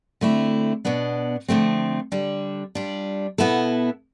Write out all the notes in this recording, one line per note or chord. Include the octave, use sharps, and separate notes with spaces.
D3 A3 C4 E4
B2 B3 D4
D3 F3 A3 C4
D3 G3 D4
G3 D4 F4
B2 B3 E4 A4